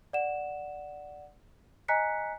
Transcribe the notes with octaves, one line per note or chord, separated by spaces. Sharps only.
D5 F#5 E7
D#5 G#5 A#5 F#6 B6 C#7